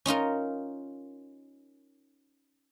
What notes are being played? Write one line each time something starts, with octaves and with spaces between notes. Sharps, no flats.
C#4 D#4 F4 A#4